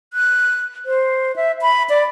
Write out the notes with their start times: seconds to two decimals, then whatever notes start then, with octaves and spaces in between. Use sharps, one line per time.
0.13 F#6
0.86 C5
1.36 E5
1.62 B5
1.90 D5